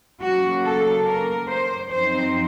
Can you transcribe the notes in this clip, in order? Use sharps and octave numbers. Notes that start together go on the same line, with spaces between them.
C#3 F#3 A#3 C#4 F#4
A4
A#4
C5
F#2 F3 C4 D#4 C5